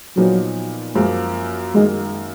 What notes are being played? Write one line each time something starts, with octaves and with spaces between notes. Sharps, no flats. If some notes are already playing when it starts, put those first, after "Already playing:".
A#2 F3 F#3 B3 D#4
F#2 F3 G#3 A#3
F#2 D#3 G#3 A#3